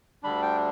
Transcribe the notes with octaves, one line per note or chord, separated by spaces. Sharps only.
D2 D3 G3 D4 B5
G5